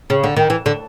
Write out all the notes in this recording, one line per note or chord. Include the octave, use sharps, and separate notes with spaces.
C#3
D3
D#3
E3
D3